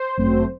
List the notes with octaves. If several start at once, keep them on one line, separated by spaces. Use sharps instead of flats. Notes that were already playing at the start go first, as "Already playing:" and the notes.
Already playing: C5
G1 F#2 F#3 A3 C4